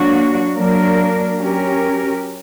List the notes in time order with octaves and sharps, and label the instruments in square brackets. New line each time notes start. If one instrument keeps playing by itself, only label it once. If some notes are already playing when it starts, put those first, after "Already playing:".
Already playing: [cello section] F#3 A#3 D4 F#4
F#3 A#3 D4 A#4
F#3 C#4 G4 A#4